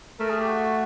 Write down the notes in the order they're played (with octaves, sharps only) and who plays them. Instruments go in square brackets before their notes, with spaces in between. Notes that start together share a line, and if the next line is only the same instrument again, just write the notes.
[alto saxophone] A3 [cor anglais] A#4
[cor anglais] G#4
G4
F#4